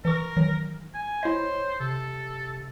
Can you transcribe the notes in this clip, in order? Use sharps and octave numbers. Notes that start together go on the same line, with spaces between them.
E3 A#4 C#6
D#3 E3 F#3
G#5
E4 C5 C#5 D#5
C3 A4